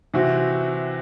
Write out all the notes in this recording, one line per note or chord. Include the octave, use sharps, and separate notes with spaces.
C3 E3 C4 F#4